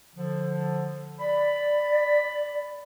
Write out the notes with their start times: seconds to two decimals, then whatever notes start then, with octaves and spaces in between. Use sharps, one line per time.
0.15 D3 F3
1.20 D5 B5